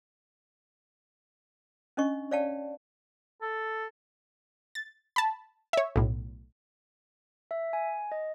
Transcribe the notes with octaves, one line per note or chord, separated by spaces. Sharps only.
C#4 D4 D#5 C#6
C#5 D5 F5 G5 A5
A4
A6
A5 B5
C#5 E5
B1 A2
E5
G#5
D#5